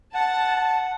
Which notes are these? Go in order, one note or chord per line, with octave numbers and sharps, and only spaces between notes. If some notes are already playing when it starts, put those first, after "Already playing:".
F#5 A5